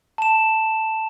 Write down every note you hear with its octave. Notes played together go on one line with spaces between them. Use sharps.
A5 E7